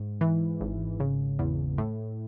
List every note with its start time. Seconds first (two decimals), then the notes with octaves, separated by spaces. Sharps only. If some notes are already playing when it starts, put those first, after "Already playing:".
Already playing: G#2
0.21 E3
0.61 G#1
1.00 C#3
1.39 E2
1.78 A2